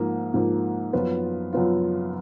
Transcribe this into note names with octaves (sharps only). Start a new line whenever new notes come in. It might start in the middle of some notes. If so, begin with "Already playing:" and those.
Already playing: G#2 F3 A#3
G#2 F3 A#3
F#2 F3 B3 F4
F#2 F3 B3 F4